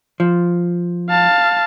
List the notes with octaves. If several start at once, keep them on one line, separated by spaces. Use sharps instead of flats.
F3
F5 A5